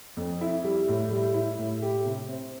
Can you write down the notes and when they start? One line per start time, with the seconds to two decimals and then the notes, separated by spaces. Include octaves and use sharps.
0.17 F2
0.41 E4
0.64 G3
0.88 A2
1.11 G3
1.34 E4
1.58 A2
1.82 G4
2.05 C3
2.29 C4